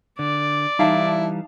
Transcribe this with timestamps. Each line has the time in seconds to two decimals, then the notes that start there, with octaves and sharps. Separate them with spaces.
0.19 D3 D5
0.79 E3 G3 D#4 E4 F5 A5